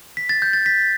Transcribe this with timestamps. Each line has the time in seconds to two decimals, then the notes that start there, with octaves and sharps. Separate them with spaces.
0.17 B6
0.29 A6
0.42 G6
0.53 A6
0.66 B6